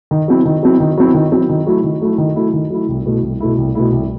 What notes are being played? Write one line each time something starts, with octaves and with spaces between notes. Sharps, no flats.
D#3
F#3 C4 E4
D#3
F#3 C4 E4
D#3
F#3 C4 E4
D#3
F#3 C4 E4
D#3
F#3 A3 E4
D#3
F#3 A3 E4
D#3
F#3 A3 E4
D#3
F#3 A3 E4
C2
B2 A3 E4
C2
B2 A3 E4
C2
B2 A3 E4
C2